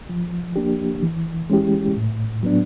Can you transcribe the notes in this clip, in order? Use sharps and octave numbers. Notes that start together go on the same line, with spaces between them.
F3
A#3 D4 G4
E3
G#3 C#4 E4 G4
A2
F#3 B3 D4